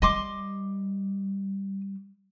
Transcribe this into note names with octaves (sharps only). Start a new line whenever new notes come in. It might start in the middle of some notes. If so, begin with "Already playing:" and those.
G3 D#5 C6 D6